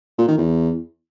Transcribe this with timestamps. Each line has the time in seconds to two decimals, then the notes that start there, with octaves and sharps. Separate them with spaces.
0.18 A#2
0.28 D#3
0.38 E2